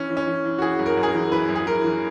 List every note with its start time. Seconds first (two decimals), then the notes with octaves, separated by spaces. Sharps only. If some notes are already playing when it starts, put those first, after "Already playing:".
Already playing: E3 C#4
0.10 E3
0.17 C#4
0.27 E3
0.45 E3
0.58 F#4
0.62 E3 G#4
0.79 F#2
0.86 A#4
0.97 F#2
1.03 G#4
1.09 A#4
1.15 E3
1.32 E3 B4
1.49 F#2
1.55 G#4
1.66 E3 A#4
1.84 E3